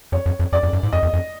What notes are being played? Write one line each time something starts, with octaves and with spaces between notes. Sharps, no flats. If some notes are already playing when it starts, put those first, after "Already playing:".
F2 C#5
F2
F2
F2 D5
F2
F#2
G#2
F2 D#5
E2
F2